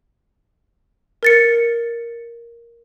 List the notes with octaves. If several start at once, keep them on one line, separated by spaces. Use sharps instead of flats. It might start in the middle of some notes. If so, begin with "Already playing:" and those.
A#4 A6 C#7